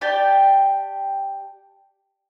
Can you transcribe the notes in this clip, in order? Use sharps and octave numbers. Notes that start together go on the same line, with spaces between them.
G4 D5 G5 A5